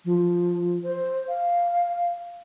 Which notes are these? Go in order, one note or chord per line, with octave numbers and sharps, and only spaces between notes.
F3
C5
F5